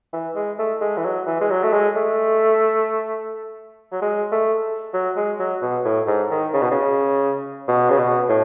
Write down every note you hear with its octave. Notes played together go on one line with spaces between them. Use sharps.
E3
G#3
A3
G#3
E3
F#3
E3
G#3
F#3
A3
G#3
A3
F#3
G#3
A3
F#3
G#3
F#3
B2
A2
G#2
D#3
C#3
B2
C#3
B2
C#3
B2
A2